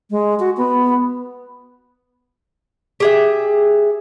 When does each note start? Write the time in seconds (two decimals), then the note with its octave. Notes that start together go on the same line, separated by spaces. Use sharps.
0.11 G#3
0.40 F#4
0.57 B3
3.00 G4 G#4 E5